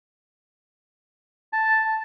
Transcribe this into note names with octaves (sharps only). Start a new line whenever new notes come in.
A5